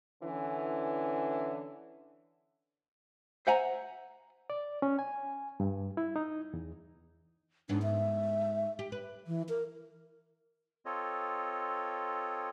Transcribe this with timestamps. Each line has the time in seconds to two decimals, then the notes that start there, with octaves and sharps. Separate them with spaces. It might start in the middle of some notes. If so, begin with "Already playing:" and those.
0.23 D3 E3 C#4
3.47 C5 E5 F#5 G#5 A#5
4.50 D5
4.82 C#4
4.99 G#5
5.60 G2
5.97 E4
6.16 D#4
6.54 E2
7.69 G#2 B3 D4
7.83 E5
8.79 G4
8.92 B4
9.27 E3
9.49 A#4
10.85 C4 F4 A4 C#5 D#5